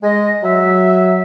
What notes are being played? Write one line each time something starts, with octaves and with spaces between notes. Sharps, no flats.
G#3 D#5
F#3 E5